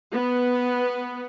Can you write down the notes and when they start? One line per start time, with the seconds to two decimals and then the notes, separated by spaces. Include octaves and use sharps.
0.12 B3